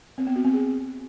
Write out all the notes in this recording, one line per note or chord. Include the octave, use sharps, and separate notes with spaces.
C4
B3
F#4
C4
G#4